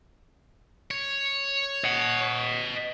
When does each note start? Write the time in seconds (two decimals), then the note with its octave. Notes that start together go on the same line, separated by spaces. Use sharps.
0.91 C#5
1.84 D#5 F#5